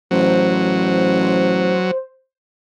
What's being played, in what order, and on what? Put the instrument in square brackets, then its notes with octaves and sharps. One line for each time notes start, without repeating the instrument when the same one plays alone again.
[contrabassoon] A1 [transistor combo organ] F#3 [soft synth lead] C5